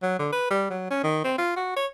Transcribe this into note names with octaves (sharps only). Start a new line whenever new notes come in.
F#3
D3
B4
G3
F#3
C#4
D#3
C4
F4
F#4
C#5